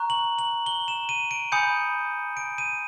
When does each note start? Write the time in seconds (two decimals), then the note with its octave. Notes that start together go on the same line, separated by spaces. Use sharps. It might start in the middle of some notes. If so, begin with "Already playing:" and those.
Already playing: A#5 C#6 F#6
0.10 F#7
0.39 F#7
0.66 G7
0.88 E7
1.09 D#7
1.31 D7
1.52 G#5 B5 D#6 G6 C#7
2.37 D7
2.58 D#7